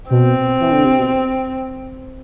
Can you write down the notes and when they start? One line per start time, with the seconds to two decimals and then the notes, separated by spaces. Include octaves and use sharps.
0.10 B2 C4
0.60 E3
0.72 D3
0.85 C3
0.98 B2